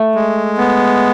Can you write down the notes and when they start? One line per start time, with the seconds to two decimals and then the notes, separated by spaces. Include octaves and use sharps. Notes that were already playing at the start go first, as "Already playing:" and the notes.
Already playing: A3
0.15 G#3
0.58 B3